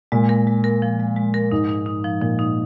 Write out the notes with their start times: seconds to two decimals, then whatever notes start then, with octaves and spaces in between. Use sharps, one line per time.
0.12 A#2 G#3
0.29 A#4
0.47 G#3
0.64 A#4
0.82 F3
1.00 G#3
1.16 G#3
1.34 A#4
1.51 G#2 D#4
1.69 D#4
1.86 D#4
2.04 F3
2.21 A#2 F3
2.39 D#4